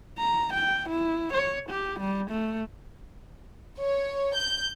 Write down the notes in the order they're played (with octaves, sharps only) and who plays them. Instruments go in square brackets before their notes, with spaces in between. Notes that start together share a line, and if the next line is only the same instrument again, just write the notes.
[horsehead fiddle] A#5
G5
E4
C#5
G4
G3
A3
[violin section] C#5
G6